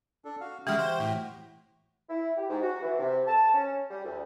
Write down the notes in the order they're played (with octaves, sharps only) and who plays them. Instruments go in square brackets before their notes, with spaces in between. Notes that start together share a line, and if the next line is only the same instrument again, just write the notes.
[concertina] D4 A4
F#4 F5
[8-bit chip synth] C#3 G#3 [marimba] E3 F6 [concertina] F#4 G4 G5
[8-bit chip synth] C5
A2
[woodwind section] E4
G4
G#2
F#4
E3
C3
A5
C#4
G3
D2